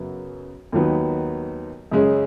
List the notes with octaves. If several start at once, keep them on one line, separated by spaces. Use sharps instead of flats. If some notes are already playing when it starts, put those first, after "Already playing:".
Already playing: F#2 C#3 F#3 B3
D#2 D#3 F#3 B3 D#4
F#2 C#3 G#3 C#4 G#4